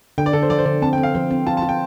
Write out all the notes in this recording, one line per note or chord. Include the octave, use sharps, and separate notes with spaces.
D3 G5
D5
D3 A4
C5
F3 D5
C5
D3 D5
C4 A5
G5
C4
F5
F3 C5
C4
F4 A5
A5
F4
G5